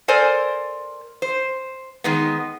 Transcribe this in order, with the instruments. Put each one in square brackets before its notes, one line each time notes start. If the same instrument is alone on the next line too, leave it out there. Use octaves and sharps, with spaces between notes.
[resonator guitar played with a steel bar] A4 A#4 C5 D5 G#5
C5
D#3 G#3 B3